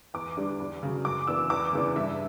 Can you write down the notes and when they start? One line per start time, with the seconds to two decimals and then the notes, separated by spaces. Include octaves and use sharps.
0.14 E2 D6
0.37 D3 G3 D4
0.60 E2
0.83 C#3 F#3
1.05 F#2 D6
1.27 E3 B3 D4 E6
1.50 E2 D6
1.73 C#3 E3 B3 D4
1.96 G2 E5